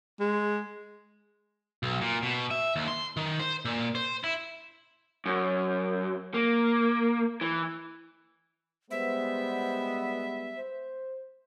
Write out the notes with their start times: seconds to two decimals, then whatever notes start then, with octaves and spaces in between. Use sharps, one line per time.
0.20 G#3
1.83 B1
2.01 A#2
2.23 B2
2.51 E5
2.76 D#2
2.88 C6
3.17 D#3
3.40 C5
3.65 A#2
3.95 C5
4.24 E4
5.26 F#2
6.34 A#3
7.41 E3
8.91 G3 G#3 B3 C5 E5
10.57 C5